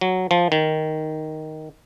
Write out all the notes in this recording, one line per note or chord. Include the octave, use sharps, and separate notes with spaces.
F#3
F3
D#3